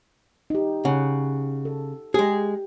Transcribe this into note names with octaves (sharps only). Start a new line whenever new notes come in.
D#4 G4
C#3 F#5
A4
G#3 G4 G#4